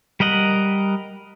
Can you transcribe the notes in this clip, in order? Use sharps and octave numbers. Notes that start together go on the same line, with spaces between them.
G3 A#4 D#5 F#5